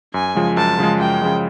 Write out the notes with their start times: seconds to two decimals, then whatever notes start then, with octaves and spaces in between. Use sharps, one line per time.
0.14 F#2 G#5
0.35 C#3 F3 G#3
0.57 F#2 A5
0.79 C#3 F3 G#3
1.00 F#2 G5
1.22 C#3 F3 G#3